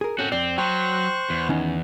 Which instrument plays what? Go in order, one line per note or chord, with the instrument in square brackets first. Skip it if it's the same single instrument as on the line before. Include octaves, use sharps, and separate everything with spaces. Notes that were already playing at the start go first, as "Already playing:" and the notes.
[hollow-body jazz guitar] G#4 A#4
[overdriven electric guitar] C4 F#4 [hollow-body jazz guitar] C#4 A4
[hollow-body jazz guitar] F2 D5 [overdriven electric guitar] C4
[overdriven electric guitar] F#3 [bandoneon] C5 C#6 F#6 [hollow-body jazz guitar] G5
[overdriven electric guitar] E2
[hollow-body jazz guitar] D#3 C#4 D#4